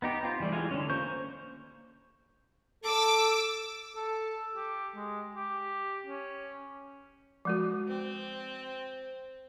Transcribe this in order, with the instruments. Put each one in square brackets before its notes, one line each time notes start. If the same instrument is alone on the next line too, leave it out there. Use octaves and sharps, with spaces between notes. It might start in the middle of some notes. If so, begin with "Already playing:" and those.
[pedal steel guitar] B3 D#4 G4
C4 F4
E3 G3 A3
E3 G#3 F4 G#5
D3 C#4
A#3 C5 C#6 G6
[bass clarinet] A4 [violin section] D6 E6
[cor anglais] A4
G4
G#3
G4
C#4
[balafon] F3 G#3 F#4
[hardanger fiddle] C4